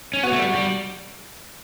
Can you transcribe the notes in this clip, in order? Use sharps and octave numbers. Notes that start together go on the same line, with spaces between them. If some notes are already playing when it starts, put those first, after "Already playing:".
C#4
B3 F#4
A3
G3
G3